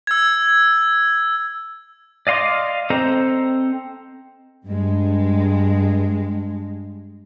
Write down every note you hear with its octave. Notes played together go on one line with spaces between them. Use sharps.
E6 G#6
D5 D#5 F5 C6 D6
C4 A4 C5 D#5 A#5
G2 G#3